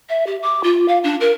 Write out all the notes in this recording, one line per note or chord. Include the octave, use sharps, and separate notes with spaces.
E5
G4
D6
F4
F5
D4
A#4